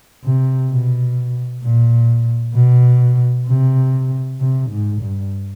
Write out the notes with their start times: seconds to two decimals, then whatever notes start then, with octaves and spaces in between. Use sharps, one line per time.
0.24 C3
0.70 B2
1.63 A#2
2.55 B2
3.47 C3
4.40 C3
4.70 G#2
5.01 G2